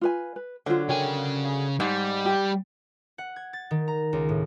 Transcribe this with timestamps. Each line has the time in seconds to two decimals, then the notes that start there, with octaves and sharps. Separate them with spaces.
0.01 F4 B4 G#5
0.36 B4
0.66 D3 F#3 F4 C5
0.89 C#3 A#4 C#5 G5 G#5
1.80 G#2 G3
2.26 G4 B5
3.18 F#5
3.36 G#6
3.53 A6
3.71 D#3
3.88 A#5
4.13 C#2
4.29 A2